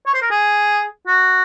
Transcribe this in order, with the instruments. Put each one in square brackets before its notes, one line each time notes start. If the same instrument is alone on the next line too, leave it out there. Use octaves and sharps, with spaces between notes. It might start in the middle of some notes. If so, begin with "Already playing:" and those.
[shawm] C#5
C5
A#4
G#4
F#4